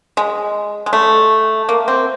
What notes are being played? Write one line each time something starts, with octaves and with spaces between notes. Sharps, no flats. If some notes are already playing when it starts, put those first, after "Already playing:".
G#3
G#3
A3
A#3
C4